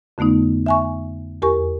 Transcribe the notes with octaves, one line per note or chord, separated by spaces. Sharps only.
F2 D3 A3 B3 D#4
E5 G#5 C#6
E2 G4 A#4 G#5 C#6